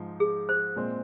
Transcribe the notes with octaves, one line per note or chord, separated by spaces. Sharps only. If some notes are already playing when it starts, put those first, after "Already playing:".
Already playing: G#2 F3
G#4
C5
A#2 G#3 C4